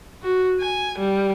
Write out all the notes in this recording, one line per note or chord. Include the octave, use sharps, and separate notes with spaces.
F#4
G#5
G3